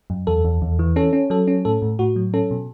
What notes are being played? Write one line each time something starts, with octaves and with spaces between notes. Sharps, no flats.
F#2
E2 A4
E2
E2
E3
C#4 A4
C#4
F#3 A4
C#4
A2 A4
A2
A2 F#4
F#3
C#4 A4
B2